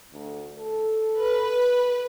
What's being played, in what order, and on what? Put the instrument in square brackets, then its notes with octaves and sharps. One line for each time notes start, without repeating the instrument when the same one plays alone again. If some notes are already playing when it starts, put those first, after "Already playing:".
[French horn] D2
A4
[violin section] B4